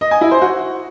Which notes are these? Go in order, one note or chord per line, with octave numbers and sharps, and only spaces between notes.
D#5
G#5
E4
C5
F#4